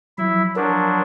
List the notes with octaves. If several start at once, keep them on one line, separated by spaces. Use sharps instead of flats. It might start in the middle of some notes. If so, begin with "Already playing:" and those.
F3 F#3 E4 E5
F3 F#3 D4 A#4